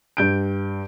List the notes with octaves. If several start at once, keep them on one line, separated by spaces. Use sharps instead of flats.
G2 G6 D7